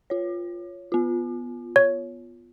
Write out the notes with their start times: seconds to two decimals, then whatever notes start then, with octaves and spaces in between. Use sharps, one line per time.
0.10 F4 C#5
0.92 B3 F4
1.76 C#5